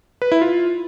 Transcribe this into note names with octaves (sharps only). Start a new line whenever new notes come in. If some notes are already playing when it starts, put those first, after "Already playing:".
B4
E4
F4